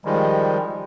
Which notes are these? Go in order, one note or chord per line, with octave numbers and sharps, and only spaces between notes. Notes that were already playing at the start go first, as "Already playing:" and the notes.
D#3 F3 G3 G#3